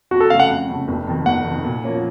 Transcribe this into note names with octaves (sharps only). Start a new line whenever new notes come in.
F2 F#4
A4
C#3 A3 F5
F#5
F2
C#3 A3
F1
F2 D#3
F1 F#5
F2 D#3
A#2
F3 A#3 C#4